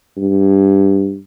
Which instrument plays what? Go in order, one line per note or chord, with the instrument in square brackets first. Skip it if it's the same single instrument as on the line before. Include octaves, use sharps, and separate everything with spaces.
[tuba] G2